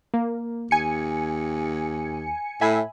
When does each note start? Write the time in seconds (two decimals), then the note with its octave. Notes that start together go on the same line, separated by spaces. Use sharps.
0.14 A#3
0.71 D#2 G#5 C#7
2.61 A2 E5 G#5 B5